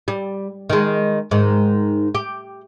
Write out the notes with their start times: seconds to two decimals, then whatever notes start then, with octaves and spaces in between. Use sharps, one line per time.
0.08 G3
0.70 D#3 G#3
1.31 G#2 D#3
2.15 G4